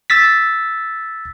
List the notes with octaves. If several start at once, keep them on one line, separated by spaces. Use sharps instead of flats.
E6 A6 B6